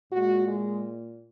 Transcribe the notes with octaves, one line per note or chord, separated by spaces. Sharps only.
A#2 G#3 F#4
G#3